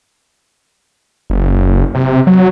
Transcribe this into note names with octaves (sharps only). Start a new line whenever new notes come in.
F#1
C3
F#3